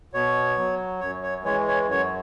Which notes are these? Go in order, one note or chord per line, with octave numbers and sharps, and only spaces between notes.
B2 C#5
F#3
F#2 C#5
C#5
E3 G#3 C#5
C#5
F#2 C#5